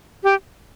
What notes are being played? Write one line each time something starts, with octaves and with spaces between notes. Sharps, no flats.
G4